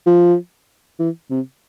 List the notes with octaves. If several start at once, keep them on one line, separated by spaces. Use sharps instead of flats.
F3
E3
C3